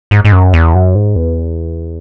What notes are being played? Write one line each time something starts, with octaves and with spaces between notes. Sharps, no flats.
G#2
G#2
F#2
E2
F#2
G#2
E2